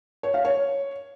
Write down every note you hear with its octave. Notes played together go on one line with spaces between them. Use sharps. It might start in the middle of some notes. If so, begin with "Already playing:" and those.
C#5
F5
C#5